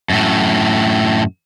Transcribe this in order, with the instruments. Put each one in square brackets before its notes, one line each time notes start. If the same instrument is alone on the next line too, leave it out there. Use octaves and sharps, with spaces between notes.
[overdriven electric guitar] F#2 A2